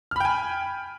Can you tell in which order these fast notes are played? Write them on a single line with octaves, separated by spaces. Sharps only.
F6 B5 G5 G#5